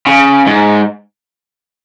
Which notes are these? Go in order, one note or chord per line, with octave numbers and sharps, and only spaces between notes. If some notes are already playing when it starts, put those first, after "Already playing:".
C#3
G#2